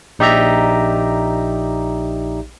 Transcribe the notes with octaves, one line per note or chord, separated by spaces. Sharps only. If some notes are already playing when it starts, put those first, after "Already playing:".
A#1 D#4 G4 D5 E5 A#5